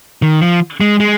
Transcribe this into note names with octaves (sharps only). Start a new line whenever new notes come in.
D#3
F3
G#3
G#3